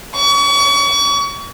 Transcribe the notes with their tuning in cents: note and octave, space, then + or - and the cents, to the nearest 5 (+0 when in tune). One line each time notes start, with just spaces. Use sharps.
C#6 +35